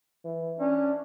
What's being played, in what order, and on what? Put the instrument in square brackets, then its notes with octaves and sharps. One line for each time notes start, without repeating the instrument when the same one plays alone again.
[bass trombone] E3
[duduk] C#4 [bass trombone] D4